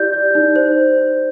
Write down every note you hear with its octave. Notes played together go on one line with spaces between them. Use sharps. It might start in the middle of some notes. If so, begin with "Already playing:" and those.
Already playing: E4 G4 D5 G6
D5
D#4
C5